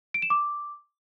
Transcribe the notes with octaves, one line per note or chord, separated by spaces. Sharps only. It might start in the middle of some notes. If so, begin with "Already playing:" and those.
D7
E7
D6